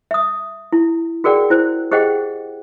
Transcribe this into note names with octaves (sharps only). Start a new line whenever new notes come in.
E5 D#6
E4
F#4 G#4 A#4 D5 F#5 G5
E4 C5
G4 G#4 C5 D#5 F#5 G5